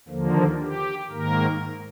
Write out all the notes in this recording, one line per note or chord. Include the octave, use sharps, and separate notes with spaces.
D#2 D3 F3 A#3
G4
G#2 D#3 A#3 A#4